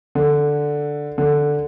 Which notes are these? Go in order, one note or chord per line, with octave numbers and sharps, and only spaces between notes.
D3
D3